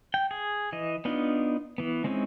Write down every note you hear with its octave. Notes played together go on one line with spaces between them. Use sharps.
G5
G#4
E3 D#5
B3 D4 D#4 F4
E3 B3
G#3 C4 C#4 D#4 E4